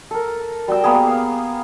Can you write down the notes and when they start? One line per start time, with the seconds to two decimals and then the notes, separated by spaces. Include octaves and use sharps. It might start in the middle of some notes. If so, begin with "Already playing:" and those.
0.11 A4 A#4
0.68 G3 F#4 G5 E6
0.84 A#3 B3 G4 G#4
1.07 F5